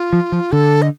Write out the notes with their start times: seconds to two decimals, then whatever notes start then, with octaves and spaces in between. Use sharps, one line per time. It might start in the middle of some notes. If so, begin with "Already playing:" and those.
Already playing: F4
0.13 F3
0.32 F3
0.52 D3 A4
0.82 D#5